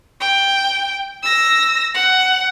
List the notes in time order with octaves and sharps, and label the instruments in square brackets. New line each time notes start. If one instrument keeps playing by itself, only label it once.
[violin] G5
E6 A#6
F#5